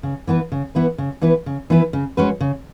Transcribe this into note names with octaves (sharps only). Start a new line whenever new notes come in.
C#3
E3 B3 E4 B4
C#3
E3 B3 E4 B4
C#3
E3 B3 E4 B4
C#3
E3 B3 E4 B4
C#3
G#3 C#4 F#4 B4
C#3